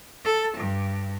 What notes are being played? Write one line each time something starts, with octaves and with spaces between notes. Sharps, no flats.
A4
G2